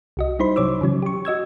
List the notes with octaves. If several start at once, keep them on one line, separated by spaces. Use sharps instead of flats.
C2 F#4 D#5
G3 D#4 E4 C5 B5 C6
C3 F#3 C#5 D6 E6
C#3 E3 F#3 C#4
G4 C#6
F#4 D#5 E6 G#6